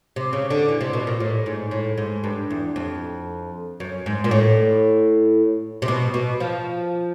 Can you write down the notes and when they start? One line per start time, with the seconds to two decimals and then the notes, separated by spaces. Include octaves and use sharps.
0.16 C3
0.33 C#3
0.50 D3
0.69 E3
0.81 C3
0.93 B2
1.07 A#2
1.20 A2
1.46 G#2
1.71 A2
1.98 G#2
2.24 G2
2.50 E2
2.76 F2
3.80 F#2
4.06 G#2
4.24 A#2
4.31 A2
5.82 C3
5.88 B2
6.14 B2
6.40 F3